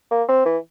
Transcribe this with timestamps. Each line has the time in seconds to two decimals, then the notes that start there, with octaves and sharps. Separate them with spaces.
0.11 A#3
0.29 C4
0.46 E3